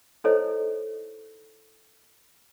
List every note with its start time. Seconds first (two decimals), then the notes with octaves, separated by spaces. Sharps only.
0.24 D#4 E4 A4 C5 C#5 D#5